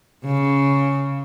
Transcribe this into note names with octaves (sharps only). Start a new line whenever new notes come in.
C#3